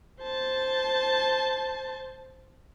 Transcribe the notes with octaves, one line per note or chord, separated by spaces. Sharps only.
C5 A5